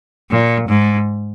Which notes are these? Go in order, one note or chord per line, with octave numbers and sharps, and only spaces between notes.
A#2
G#2